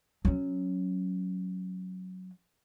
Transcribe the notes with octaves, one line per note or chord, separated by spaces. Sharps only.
F#3 C#4